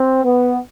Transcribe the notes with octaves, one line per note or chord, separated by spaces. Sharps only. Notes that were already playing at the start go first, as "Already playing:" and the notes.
Already playing: C4
B3